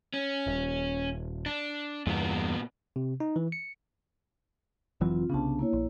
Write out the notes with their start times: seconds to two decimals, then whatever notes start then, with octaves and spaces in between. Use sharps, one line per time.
0.14 C#4
0.46 D#1
1.46 D4
2.07 E2 G2 A#2 B3
2.96 C3
3.20 D#4
3.36 E3
3.52 C#7
5.01 F1 E3 F#3 C4 F4
5.30 C2 C#3 B3 D4 A5
5.59 A#3 E4 C#5
5.73 A#1